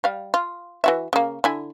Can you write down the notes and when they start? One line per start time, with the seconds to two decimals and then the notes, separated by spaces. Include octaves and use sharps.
0.04 G3 F5
0.34 F4
0.84 E3 F#4 E5
1.13 C#3 A#3
1.44 D3 E4 G#5